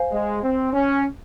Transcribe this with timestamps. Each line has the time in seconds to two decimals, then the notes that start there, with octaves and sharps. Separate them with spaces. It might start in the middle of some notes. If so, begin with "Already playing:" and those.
Already playing: C5 F5 G#5
0.12 G#3
0.43 C4
0.73 C#4